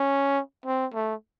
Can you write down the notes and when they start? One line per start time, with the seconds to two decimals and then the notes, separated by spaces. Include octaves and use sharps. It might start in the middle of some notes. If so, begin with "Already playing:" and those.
Already playing: C#4
0.66 C4
0.94 A3